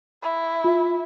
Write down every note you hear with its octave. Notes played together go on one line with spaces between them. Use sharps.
E4
F4 E5